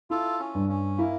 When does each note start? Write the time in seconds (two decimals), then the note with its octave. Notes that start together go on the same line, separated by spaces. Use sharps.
0.10 E4 F4 A4
0.40 C#4
0.54 G2
0.69 C#4
0.98 A#3 E4